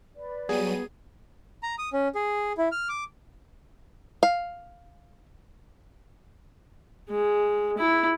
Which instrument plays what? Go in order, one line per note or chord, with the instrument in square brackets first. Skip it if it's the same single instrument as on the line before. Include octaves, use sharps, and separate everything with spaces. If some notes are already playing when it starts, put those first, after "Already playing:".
[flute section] B4 D5
[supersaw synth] F#3 G3 D#7 [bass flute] B3 [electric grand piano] G#4
[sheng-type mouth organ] A#5
D#6
C#4
G#4
E4
F6
D6
[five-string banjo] F5
[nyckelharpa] G#3
E4